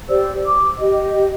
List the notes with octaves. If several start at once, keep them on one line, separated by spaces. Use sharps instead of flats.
G4 C5 D5 E6
D6
G4 D#5